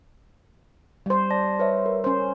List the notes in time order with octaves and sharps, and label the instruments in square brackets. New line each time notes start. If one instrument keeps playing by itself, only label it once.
[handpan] G3 C5
[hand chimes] D5 A5 A#6
B4 C#5 E5
A#4
[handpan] C#4 C5